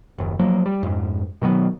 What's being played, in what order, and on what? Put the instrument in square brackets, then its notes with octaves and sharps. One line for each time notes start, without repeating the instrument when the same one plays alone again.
[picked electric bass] F#1 D#2
F3 F#3 A#3
G3
F2 G#2
B2 D#3 F#3 B3